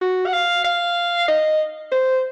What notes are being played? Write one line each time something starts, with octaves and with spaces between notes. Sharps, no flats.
F#4
F#5
F5
F5
D#5
C5